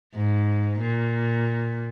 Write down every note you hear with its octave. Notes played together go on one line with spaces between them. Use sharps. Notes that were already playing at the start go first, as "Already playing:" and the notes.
G#2
A#2